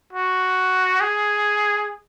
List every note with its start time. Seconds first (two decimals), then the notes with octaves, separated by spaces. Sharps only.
0.13 F#4
1.00 G#4